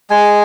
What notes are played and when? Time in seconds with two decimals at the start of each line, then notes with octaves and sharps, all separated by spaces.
0.10 G#3 G#5